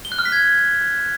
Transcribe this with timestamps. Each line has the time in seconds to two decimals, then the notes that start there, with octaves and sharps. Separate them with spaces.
0.05 G7
0.12 F#6
0.19 F6
0.25 B6
0.32 G#6